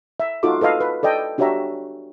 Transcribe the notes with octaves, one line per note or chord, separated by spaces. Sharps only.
E5
D#4 F4 F#4 A4 D6
A4 B4 D#5 F5
B4
A4 D5 D#5 G5
D4 F#4 G4 C#5 E5 A#5